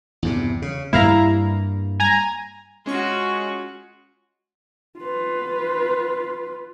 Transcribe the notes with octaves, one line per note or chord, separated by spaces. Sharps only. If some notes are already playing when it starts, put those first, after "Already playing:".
E2 G2 C3
C#3
G2 G3 A#3 E4 F5 A#5
G#5 A#5 G#6
G#3 C#4 F4 F#4 C#6
F4 B4